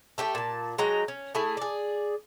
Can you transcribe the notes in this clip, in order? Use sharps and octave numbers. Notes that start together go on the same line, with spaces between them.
A3 G4 G5
A#2 A5
F#3 G#3 G5 A#5
C#4
A3 E4 G#4
G#4 D5